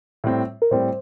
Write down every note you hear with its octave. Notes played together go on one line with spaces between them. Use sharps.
A2 G3 C4
A#4
A2 G3 C4 C5